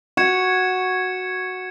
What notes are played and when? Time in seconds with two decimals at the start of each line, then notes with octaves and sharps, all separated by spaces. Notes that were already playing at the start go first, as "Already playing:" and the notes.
0.17 F#4 C#6 G#6 C#7 E7